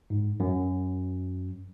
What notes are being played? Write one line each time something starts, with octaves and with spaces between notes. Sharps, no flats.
G#2
F#2